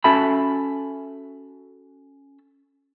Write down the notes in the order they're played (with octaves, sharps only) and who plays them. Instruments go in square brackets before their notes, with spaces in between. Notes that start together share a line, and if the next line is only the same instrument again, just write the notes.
[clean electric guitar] C#4 F#4 A4 E5 A5 B5